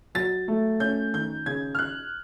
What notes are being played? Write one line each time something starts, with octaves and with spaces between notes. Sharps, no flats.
F#3 A6
A3
C#4 G6
D#3 G6
C#3 G#6
F6
F#6